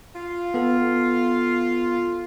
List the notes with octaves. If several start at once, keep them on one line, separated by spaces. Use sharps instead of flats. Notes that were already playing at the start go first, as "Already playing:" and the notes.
F4
B3 A4